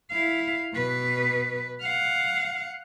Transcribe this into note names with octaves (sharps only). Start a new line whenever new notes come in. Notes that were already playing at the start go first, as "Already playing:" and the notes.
E4 F5
B2 B4
F5 F#5